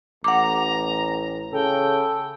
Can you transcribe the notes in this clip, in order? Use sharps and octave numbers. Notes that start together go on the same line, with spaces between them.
A1 F#5 A#5 D6
C#3 A4 G5